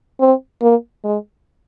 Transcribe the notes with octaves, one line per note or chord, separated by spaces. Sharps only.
C4
A#3
G#3